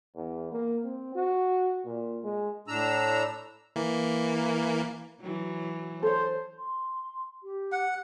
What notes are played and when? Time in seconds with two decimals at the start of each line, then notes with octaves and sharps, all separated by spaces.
0.16 E2
0.52 A#3
0.84 C4
1.15 F#4
1.86 A#2
2.24 G#3
2.68 A2 D4 A#5 E6
3.76 E3 A#3
5.21 E3 F#3
6.03 A4 C5 C#5
6.58 C6
7.43 G4
7.72 F#5